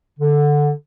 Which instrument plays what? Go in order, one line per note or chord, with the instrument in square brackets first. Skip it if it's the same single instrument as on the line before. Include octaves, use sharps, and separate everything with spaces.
[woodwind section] D3